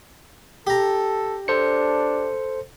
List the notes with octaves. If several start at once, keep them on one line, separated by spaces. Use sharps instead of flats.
G4 A4 A#5
D4 A4 C5 C#7